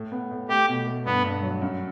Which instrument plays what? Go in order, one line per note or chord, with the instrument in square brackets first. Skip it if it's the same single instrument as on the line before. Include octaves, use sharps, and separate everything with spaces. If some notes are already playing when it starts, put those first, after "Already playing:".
Already playing: [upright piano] A2
B3
A2
[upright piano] A3 [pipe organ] G4
[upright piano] B2
A3
[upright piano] G2 [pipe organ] B3
[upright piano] G2
F#3
F#2